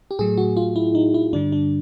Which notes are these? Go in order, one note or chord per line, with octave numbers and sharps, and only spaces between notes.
G4
A2 F#3 A3 G#4
F#4
F4
E4
D#4
E4
G2 D3 G3 D4
D4